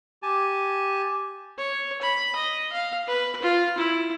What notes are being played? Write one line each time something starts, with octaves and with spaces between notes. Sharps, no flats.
G4 G#5 A5
C#5
B5
D#5
F5
B4
F4
E4